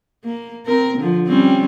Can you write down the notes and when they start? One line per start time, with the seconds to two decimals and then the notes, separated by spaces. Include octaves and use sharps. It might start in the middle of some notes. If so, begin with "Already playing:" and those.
0.24 A#3
0.66 C4 A#4
0.97 D3 F3
1.27 G3 C4 C#4